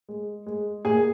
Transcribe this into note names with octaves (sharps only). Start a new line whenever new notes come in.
G#3
G#3
A#2 G#4 G#5